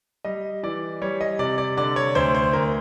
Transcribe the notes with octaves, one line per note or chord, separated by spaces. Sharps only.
G3 D#5
E3 D5
G3 C#5
D#5
C3 D5
D5
D3 D5
C#5
D2 C5
C5
D2 A#4